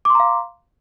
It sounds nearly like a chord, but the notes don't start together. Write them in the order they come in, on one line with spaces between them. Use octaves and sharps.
D6 C6 A#5 F5